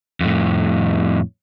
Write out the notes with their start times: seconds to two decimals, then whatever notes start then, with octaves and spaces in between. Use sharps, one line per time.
0.20 F2 A2